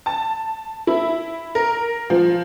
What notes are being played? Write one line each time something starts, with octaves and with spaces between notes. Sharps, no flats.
A5
E4
A#4
F3